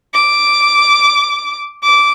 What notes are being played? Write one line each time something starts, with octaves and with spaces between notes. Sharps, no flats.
D6
D6